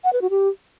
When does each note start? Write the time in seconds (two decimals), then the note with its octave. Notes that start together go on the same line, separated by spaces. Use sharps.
0.04 F#5
0.13 B4
0.22 F#4
0.30 G4